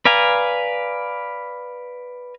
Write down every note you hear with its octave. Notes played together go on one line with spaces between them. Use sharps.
B4 D5 F5 G#5 A#5